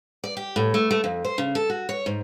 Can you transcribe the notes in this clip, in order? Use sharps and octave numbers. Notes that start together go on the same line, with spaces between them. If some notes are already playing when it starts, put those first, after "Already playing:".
D5
G4
A2
A3
A3
F2
C5
C#3
A4
F#4
C#5
G#2